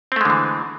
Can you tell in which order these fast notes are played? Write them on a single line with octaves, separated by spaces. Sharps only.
C4 A3 G#3 D3 E3